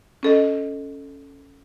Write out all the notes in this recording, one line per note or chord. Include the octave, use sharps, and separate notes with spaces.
C#4 A4 D#5